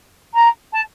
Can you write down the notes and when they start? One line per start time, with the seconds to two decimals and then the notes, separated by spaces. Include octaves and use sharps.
0.34 A#5
0.73 A5